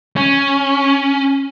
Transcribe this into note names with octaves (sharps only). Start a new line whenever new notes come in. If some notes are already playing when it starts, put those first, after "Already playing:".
C#4